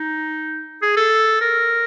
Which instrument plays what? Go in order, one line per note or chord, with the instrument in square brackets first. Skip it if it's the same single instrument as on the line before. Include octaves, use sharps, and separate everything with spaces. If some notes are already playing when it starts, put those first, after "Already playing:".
Already playing: [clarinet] D#4
G#4
A4
A#4